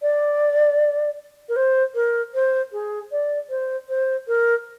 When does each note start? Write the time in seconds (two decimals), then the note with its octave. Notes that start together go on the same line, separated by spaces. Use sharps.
0.02 D5
1.49 A#4
1.56 C5
1.95 A#4
2.34 C5
2.73 G#4
3.12 D5
3.50 C5
3.89 C5
4.28 A#4